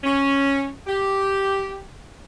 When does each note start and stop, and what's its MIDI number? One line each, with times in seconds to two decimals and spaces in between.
0.04 0.69 61
0.87 1.83 67